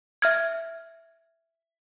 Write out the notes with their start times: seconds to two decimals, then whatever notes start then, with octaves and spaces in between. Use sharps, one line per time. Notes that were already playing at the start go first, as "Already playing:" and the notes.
0.22 E5 F6 G#6